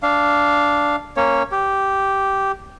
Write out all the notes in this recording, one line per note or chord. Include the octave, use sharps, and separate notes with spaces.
D4 F5
A#3 C#4 C#5
G4